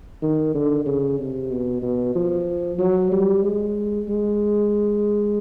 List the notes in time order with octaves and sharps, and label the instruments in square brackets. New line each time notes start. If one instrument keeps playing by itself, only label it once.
[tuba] D#3
D3
C#3
C3
B2
B2
F3
F#3
G3
G#3
G#3